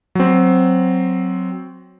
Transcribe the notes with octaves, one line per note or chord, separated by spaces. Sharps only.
F#3 C4